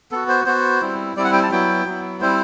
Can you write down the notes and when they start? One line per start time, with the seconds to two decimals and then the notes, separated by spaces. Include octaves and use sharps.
0.11 B3 F#4 A4
0.29 C5
0.46 B3 F#4 C5
0.81 G3 C4 E4
1.16 G3 C4 E4 D5
1.24 F#5
1.33 G5
1.43 A5
1.51 F#3 B3 E4 G5
1.86 F#3 B3 E4
2.21 G3 C4 E4 C5